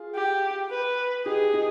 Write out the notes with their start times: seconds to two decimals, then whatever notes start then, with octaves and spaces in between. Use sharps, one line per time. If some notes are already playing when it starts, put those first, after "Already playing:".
Already playing: F4 G#4
0.15 G4
0.71 B4
1.26 D#4 G4 G#4
1.53 D#4 G4